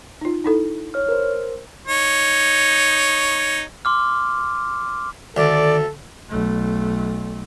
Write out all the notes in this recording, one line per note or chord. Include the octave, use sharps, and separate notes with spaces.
D#4 F4
D#4 E4 A4
C#5 F6
A#4 C5
D#4 C#5
C6 D6 F6
D2 D#3 A4 D5
B1 A3